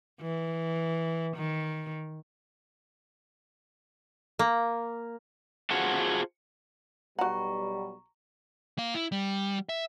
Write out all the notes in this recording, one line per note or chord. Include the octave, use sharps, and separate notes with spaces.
E3
D#3
A#3
F4 F#4 G#4 C5 F#5 A5
B1 B2 G3 F#4 F#5 A#5 C#6
A#3 F5
E4
G3
E5